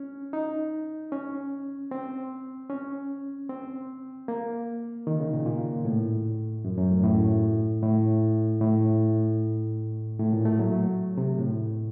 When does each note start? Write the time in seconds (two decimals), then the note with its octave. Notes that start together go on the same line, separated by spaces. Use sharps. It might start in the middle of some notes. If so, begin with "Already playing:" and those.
Already playing: C#4
0.33 D#4
1.12 C#4
1.91 C4
2.70 C#4
3.49 C4
4.28 A#3
5.07 D#3
5.20 C#3
5.33 A#2
5.46 A#2
5.85 A2
6.65 F#2
6.77 F#2
6.91 A2
7.04 A2
7.83 A2
8.61 A2
10.19 A2
10.33 A#2
10.45 A3
10.59 F#3
10.72 A3
11.17 C3
11.38 A2